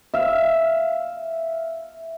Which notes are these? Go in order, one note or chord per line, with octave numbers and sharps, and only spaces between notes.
E5 F5